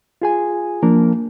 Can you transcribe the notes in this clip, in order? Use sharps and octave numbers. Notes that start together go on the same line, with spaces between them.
F4 G#4 G#5
F3 A#3 D4 A#4